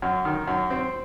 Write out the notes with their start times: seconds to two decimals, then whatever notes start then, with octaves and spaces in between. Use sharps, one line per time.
0.02 F#2
0.25 D#3
0.48 F#2
0.70 C4